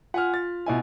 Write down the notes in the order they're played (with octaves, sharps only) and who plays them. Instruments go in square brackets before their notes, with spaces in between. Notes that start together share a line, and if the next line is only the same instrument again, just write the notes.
[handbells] F4 [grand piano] F#5 G#5 F6
[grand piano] A6
B2 E4 G#5